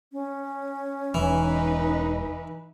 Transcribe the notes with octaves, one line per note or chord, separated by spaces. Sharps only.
C#4
E1 E3 D#4 B4